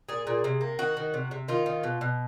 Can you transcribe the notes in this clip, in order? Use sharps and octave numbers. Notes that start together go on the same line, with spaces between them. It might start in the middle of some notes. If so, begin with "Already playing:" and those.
A#2 G#4
A#2
C3
A#3
D#3 F#4
D#3
C3
C3
D#3 F4
D#3
B2
B2